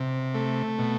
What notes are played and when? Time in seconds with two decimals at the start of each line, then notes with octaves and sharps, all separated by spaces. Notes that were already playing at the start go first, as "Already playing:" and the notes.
Already playing: C3
0.34 A3
0.79 B2